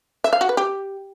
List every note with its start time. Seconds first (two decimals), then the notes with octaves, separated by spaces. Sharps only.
0.24 E5
0.33 F5
0.41 F#4
0.49 B4
0.57 G4